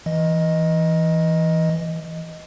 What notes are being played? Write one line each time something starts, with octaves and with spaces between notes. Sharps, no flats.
E3 D#5